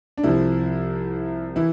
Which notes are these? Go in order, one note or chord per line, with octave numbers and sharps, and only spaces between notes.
D4
C2 C3 F3 E4
E3 E4